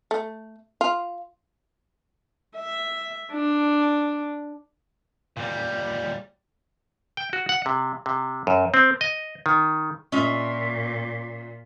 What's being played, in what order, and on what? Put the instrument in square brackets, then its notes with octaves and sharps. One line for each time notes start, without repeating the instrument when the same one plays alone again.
[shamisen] A3
F4
[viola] E5
D4
[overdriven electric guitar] A#2 G3
[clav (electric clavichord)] G5
F#4
F#5
C3
C3
F#2
C4
D#5
D#3
[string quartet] A#2 [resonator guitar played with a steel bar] C#4 F4 D#5 [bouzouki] E5